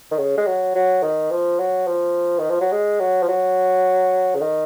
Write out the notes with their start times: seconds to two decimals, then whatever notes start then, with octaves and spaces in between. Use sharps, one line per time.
0.11 D#3
0.18 C#3
0.38 G#3
0.47 F#3
0.75 F#3
1.03 D#3
1.31 F3
1.59 F#3
1.87 F3
2.39 D#3
2.50 F3
2.61 F#3
2.72 G#3
3.00 F#3
3.22 F3
3.28 F#3
4.35 C#3
4.41 D#3